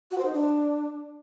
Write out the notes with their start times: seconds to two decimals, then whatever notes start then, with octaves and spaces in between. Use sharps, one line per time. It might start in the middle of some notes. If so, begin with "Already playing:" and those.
0.11 F#4
0.18 C5
0.25 D#4
0.32 D4